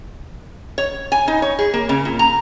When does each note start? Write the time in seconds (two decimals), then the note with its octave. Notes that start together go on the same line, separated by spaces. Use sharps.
0.78 C#5
1.12 G#5
1.28 D#4
1.42 C#5
1.59 G#4
1.74 A#3
1.89 C#3
2.05 A#2
2.19 A#5